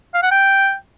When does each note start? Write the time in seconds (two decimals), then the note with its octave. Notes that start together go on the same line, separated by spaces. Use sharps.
0.14 F5
0.23 F#5
0.31 G5